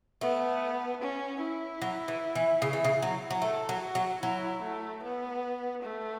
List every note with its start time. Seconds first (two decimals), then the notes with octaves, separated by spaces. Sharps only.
0.21 A3 B3
1.01 C#4
1.41 E4
1.82 F#3
2.08 E3
2.35 E3
2.62 C#3
2.73 E3
2.84 C#3
3.02 F#3
3.31 F#3
3.42 A3 A4
3.69 F#3
3.82 F#4
3.95 F#3
4.22 F#3 E4
4.62 A3
5.03 B3
5.82 A3